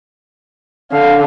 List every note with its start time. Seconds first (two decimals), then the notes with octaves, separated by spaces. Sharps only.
0.92 D3 F5